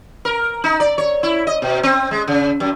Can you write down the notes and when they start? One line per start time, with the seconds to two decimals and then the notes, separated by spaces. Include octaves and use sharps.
0.25 A#4
0.64 D#4
0.80 D5
0.98 C#5
1.23 E4
1.47 D#5
1.62 B2
1.83 C4
2.11 G#3
2.28 C#3
2.60 F#2